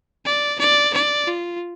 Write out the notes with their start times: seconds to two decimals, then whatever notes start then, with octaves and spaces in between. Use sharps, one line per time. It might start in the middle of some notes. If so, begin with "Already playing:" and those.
0.26 D5
0.59 D5
0.94 D5
1.28 F4